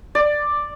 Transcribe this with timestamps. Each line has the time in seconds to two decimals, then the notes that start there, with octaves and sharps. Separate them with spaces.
0.15 D5